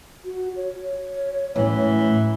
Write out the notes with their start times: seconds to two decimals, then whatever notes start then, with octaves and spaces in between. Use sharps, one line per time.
0.25 F#4
0.56 C#5
1.56 F#2 A2 E3